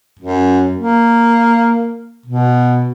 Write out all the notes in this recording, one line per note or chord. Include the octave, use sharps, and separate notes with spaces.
F#2
A#3
B2